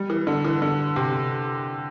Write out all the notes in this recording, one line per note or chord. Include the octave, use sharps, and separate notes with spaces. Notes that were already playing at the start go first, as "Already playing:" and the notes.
Already playing: G3
E3
D3
E3
D3
C3